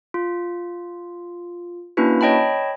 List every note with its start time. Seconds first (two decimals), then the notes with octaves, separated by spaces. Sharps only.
0.14 F4
1.97 A#3 C#4 D4 E4 F#4 B4
2.21 C#5 D#5 G5 A5 B5